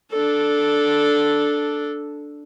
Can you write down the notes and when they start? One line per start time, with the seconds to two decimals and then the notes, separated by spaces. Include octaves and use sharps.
0.12 D4 A4